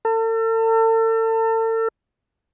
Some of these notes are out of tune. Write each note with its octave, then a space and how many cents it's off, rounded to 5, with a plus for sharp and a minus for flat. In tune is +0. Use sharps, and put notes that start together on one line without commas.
A4 +40